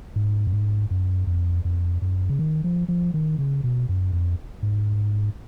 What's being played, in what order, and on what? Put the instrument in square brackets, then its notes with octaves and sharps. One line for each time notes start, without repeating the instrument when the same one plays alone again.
[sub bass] G#2
F#2
G#2
F#2
F2
F2
F#2
C#3
D#3
F3
F3
D#3
C#3
B2
F#2
F2
G#2